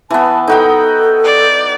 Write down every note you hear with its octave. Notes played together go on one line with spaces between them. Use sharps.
E3 B3 A5
D#4 F#4 A4 G5
D5